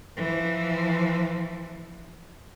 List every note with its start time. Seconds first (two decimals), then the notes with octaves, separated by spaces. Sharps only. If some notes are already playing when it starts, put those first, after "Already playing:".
0.17 E3 F3